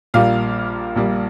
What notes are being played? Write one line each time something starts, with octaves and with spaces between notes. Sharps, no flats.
A#1 A#2 G3 A#3 F5
A#1 A#2 G3 A#3